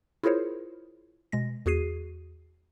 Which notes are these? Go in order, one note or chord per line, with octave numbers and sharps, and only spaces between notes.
E4 F4 G#4 A#4 C5 C#5
B2 G#3 A#6
E2 F#4 G#4 C7 D#7